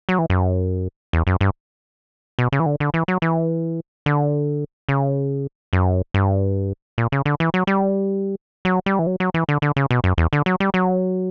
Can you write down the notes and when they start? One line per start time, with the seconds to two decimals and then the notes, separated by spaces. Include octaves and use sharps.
0.09 F#3
0.19 E3
0.30 F#2
1.13 E2
1.27 F#2
1.41 G2
2.39 B2
2.52 C#3
2.60 E3
2.66 D3
2.80 D3
2.94 E3
3.08 F#3
3.22 E3
4.06 D3
4.89 C#3
5.73 F#2
6.14 G2
6.98 A#2
7.12 C#3
7.25 D3
7.40 E3
7.54 F#3
7.67 G3
8.65 F#3
8.86 G3
8.99 E3
9.07 F#3
9.20 F#3
9.34 E3
9.49 D3
9.62 D3
9.76 C#3
9.91 B2
10.04 F#2
10.18 E2
10.33 D3
10.46 F#3
10.60 G3
10.74 F#3